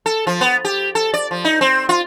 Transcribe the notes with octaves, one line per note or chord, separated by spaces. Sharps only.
A4
F3
B3
G4
A4
D5
F3
D#4
C4
F4